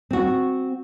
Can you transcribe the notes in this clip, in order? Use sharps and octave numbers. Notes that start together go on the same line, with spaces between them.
C4 F#4